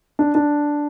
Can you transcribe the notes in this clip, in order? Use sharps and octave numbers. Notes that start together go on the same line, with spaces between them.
D4
D4